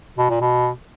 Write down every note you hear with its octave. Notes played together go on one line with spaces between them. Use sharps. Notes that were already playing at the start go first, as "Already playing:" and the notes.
B2
A#2
B2